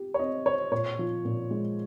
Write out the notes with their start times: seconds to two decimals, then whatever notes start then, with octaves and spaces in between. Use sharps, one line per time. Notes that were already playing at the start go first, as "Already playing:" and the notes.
Already playing: G4
0.14 C#5
0.19 C4 D#5
0.46 C5 C#5
0.71 A#2 C#5
0.99 F3
1.25 A#2
1.51 G#3